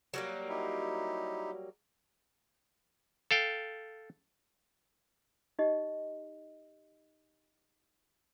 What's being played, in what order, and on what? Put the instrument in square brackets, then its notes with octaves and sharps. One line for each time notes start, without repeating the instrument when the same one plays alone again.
[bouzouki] F#3 G3 A#3
[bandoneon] D#4 E4 G4
[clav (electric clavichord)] A4 F5 G5
[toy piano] D#4 G4 D#5